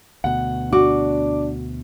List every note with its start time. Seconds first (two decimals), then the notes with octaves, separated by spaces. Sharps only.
0.24 D2 B2 F#5
0.73 D4 F#4 D6